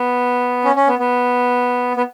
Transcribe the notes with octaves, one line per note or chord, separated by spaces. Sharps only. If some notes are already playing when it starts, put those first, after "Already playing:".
Already playing: B3
C#4
C#4
B3
B3
B3